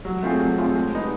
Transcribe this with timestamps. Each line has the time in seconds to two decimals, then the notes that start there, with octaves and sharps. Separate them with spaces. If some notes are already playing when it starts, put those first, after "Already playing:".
0.05 F#3
0.22 A3 C4 F4 G#4
0.40 F#3
0.58 A3 C4 F4 G#4
0.76 G#3
0.93 B3 D#4